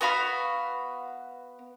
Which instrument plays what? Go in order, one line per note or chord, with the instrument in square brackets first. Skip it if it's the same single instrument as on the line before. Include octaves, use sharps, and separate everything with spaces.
[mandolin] B3 F#4 F5 B5